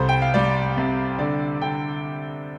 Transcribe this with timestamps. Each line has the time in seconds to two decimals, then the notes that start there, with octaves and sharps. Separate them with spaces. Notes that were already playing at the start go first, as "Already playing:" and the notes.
Already playing: C2 G3 A4 C5
0.09 G5
0.22 F5
0.34 G3 D5
0.77 C3
1.19 D3 D5
1.61 D3 G5